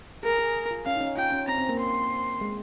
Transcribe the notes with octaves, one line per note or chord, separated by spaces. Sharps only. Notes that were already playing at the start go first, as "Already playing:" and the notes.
G#4 A#4
G#4
F4
C#4 F5
D#4
C#4
F4 G5
C#4
C4 A#5
C4
A#3
C6
G#3